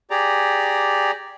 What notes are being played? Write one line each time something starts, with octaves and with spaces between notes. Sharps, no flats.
G4 G#4 D5 A#5